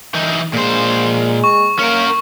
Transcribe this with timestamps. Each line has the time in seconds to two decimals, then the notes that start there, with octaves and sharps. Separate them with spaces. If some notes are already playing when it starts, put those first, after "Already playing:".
0.14 E3 D#4
0.53 A#2 G#3 C5
1.44 C#6
1.79 A#3 C#4 A#4